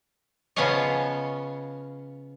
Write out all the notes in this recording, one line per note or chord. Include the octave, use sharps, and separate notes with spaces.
C#3 F3 B3 C#4 C#5 D#5